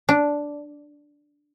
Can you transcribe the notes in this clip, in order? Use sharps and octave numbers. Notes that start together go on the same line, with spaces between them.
D4